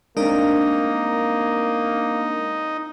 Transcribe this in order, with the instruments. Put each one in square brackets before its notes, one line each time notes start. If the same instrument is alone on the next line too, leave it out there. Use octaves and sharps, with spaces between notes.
[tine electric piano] G#3 C4 [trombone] A#3 [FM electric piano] D4 A#4 [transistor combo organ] D#4